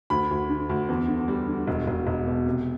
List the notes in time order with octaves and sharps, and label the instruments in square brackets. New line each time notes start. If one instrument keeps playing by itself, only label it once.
[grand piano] D2 B5
D2
D3
D2
E2
D3
G3
D3
E1
E1
E1
B2
C3